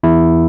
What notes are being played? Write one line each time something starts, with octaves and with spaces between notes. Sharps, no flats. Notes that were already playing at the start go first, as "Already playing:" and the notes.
E2 E4